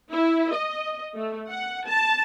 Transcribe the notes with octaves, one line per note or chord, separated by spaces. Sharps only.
E4
D#5
A3
F#5
A5